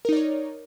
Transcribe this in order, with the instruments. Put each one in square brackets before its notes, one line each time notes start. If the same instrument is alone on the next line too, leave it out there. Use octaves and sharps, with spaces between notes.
[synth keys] A#4
D#4
D5
C#5